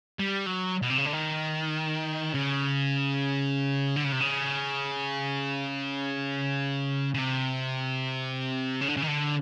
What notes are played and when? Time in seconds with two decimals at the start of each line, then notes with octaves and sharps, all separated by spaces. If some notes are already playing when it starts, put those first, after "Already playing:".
0.19 G3
0.46 F#3
0.82 B2
0.90 C3
0.98 C#3
1.05 D3
1.13 D#3
2.34 C#3
3.96 D3
4.04 C#3
4.12 C3
4.21 C#3
7.14 C#3
7.18 C3
8.81 C#3
8.88 D3
8.97 C#3
9.02 D#3
9.08 D3